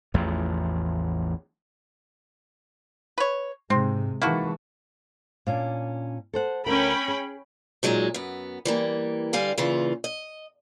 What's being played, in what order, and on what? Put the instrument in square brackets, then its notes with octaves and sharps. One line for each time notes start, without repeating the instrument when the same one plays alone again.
[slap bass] A1 E2 A2 F3
[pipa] B4 C#5
[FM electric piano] G#2 [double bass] C3 G#3 [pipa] C4
[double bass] E3 G#3 [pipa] A#3 E4 F#4 [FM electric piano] D#4 A5 C#6
[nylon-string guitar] A#2 C#4 D4
A4 C5 F#5
[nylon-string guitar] D2 A#4 [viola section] C#4 G5 B5
[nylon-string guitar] G#4
[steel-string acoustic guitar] A#2 F#3 G#3 D4 D#4
F#2 B3
E3 G3 A#3
D3 G3 F5 G#5
A#2 C#3 E3 F4
D#5